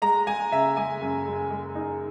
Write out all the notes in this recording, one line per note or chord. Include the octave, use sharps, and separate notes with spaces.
G#3 A#5
G#3 G#5
C#3 E5
G#3 G#5
F#2
G#3
G#3
D#4